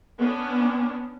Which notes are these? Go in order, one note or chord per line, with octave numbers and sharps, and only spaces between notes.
B3 C#4 D4